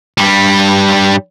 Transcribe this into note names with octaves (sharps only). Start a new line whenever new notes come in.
G2 G3